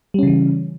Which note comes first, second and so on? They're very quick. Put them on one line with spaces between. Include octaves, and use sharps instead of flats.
G3 C#4 C#3 E3